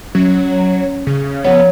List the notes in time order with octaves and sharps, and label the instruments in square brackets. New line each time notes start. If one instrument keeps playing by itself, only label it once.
[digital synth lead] F#3 [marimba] C#4
[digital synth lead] C#3
[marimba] F3 C#5 [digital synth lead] B3